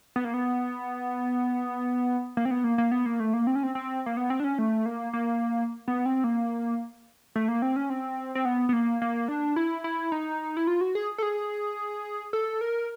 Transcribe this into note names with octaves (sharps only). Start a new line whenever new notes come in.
B3
A#3
B3
A#3
C4
B3
A#3
A#3
B3
A#3
A3
A#3
C4
C#4
C4
C4
A#3
B3
C4
D4
C#4
A3
A#3
A#3
B3
C4
A#3
A3
A#3
C4
C#4
C4
C4
B3
B3
A#3
A#3
D4
E4
E4
D#4
E4
F4
F#4
G#4
A4
G#4
A4
A#4